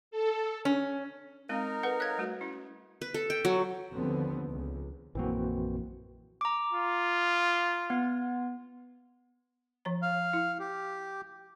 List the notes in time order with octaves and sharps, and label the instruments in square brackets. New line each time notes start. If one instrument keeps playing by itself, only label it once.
[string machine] A4
[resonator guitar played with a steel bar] C#4
[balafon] G#3 C4 F5 [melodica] D#4 A#4
[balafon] A4 [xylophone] B4 F#5
[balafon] C#5 F5 [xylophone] F#6 G#6
[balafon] G3 A3 F#4
C#4 E4
[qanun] B4
A4
G5
F#3
[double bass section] D#2 D3 F3 B3 C4
C#2
[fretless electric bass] A#1 F#2 A#3 [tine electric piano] E3 C4 F#4
[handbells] A#5 D6
[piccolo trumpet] F4
[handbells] B3
[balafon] F3 C#5 A#5
[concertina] F5
[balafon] E4
[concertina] G4